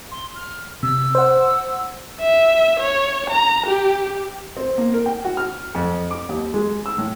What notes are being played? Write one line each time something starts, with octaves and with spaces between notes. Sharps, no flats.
C6
F6
C3 E6
C5 F#5
E5
C#5
A#5
G4
C4
A#3
A#4
G5
F#4
F6
F2
D6
D#2
G#3
E6
A2